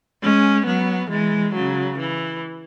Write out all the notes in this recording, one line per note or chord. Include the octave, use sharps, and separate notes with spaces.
G#3 C#4
F#3 B3
E3 G#3
C#3 F#3
E3